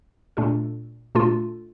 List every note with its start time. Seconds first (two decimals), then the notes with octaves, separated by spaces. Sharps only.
0.37 A#2 A3 D4 F4 A4
1.15 A#2 A3 D4 F4 A4